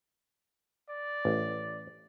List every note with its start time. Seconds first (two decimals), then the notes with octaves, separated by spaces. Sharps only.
0.89 D5
1.25 A1